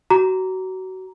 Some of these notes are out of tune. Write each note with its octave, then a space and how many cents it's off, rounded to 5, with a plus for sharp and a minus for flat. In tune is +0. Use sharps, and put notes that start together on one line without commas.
F#4 +25 A#5 +0 D6 -25